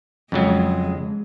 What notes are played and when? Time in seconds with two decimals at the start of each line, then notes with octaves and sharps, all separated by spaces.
0.32 F2 C#3 F#3 G#3